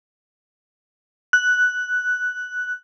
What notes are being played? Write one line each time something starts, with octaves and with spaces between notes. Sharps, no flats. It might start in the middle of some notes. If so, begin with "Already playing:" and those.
F#6